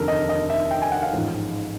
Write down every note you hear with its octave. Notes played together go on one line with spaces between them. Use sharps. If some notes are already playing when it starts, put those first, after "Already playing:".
Already playing: F1 D#2 D3 A4 A#4
D#5
D#5
E5
G5
G#5
F#5
F5
A1 G#2 F3